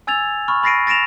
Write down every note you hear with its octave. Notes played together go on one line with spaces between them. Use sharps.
G#5 E6 G#6 A6 F7
B5 C#6 F6
B5 A6 A#6 C7 D7 D#7
A6 A#6 D7 E7 F7